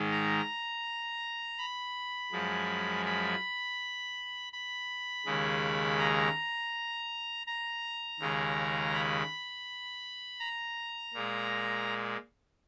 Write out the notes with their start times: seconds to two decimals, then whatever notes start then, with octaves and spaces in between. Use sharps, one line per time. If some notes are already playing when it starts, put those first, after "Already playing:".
Already playing: G#2 D#3 G#3
0.12 A#5
1.58 B5
2.32 F#2 F3 G#3
3.05 B5
4.53 B5
5.26 D#2 C#3 G#3
5.99 A#5
7.47 A#5
8.20 D#2 C#3 G#3
8.94 B5
10.40 A#5
11.14 A#2 G#3